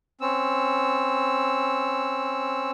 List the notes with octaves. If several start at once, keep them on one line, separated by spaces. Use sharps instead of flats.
C4 C#4 E6